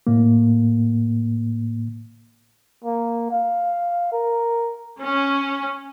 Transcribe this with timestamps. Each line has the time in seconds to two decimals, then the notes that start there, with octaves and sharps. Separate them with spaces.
0.07 A2 A#3
2.84 A#3
3.31 F5
4.13 A#4
4.99 C#4